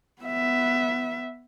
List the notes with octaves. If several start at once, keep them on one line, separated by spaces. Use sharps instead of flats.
B3 E5